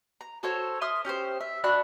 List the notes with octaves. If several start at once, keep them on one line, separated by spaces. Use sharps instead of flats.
A#5
F#4 A4 C5 C#5
E5 C6 D#6 F6
C#4 G4 B4 C5
E5
D4 F#4 B5 F#6